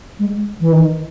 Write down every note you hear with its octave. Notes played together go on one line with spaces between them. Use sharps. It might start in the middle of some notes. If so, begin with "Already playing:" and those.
G#3
E3
D#3